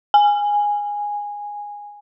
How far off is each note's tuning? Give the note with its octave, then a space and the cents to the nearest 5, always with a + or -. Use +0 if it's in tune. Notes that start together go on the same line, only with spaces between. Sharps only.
G#5 -10